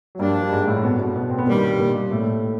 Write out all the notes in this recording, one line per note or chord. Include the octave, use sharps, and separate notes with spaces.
F#3
G2 F3 G3 A#3 D4
G3
G#2 G#3
A2 A3
B2 B3
B2 B3
B2 B3
C4
B3
G2 A#2 D#3 G3 A#3
A#2 A#3
A2 A3